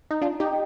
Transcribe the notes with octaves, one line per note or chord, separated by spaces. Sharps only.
D#4
D4 F4
D#4 G4